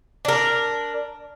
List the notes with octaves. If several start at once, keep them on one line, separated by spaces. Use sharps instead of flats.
D4 A#4